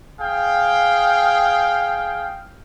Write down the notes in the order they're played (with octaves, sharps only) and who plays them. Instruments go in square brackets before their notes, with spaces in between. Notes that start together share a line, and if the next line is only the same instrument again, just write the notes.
[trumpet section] G#4 F5 G5